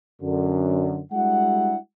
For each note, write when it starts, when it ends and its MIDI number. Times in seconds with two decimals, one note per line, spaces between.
0.22 0.99 42
0.22 0.99 50
1.12 1.76 55
1.12 1.76 56
1.12 1.76 62
1.12 1.76 64
1.12 1.76 66
1.12 1.76 78